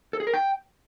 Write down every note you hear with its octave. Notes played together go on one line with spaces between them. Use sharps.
A4
G#4
A#4
G5